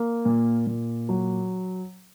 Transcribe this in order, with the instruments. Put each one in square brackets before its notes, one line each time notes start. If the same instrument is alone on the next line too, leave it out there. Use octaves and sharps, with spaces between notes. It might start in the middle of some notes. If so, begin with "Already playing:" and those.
Already playing: [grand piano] A#3
A#2
A#2
F#3